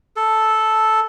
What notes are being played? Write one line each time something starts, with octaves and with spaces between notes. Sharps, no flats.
A4